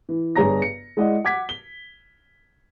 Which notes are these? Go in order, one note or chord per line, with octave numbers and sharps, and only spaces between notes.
E3
G1 G2 G#4 C#5 A#5 A#6
C#7
G#3 E4 D5 D#5 F#5
F#5 D6 G#6 B6
G7